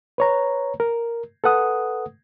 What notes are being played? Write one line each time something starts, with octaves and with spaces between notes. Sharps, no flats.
B4 C#5 A#5
A#4
A4 B4 F#5 D#6